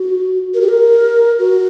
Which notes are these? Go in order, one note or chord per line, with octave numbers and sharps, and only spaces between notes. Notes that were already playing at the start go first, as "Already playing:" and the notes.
Already playing: F#4
A#4
G4
A#4
F#4